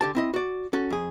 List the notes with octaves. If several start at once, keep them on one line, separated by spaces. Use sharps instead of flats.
D3 G4 A5
C4 E4 D#5
F#4 D5
C#4 F#4 A4
F2 G#4